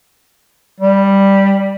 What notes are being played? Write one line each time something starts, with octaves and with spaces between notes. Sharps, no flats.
G3